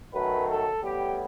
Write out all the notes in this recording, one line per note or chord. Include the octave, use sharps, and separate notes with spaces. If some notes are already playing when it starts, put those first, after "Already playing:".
F#2 D#3 F#3 A3 B4
A4
A2 G3 B3 G4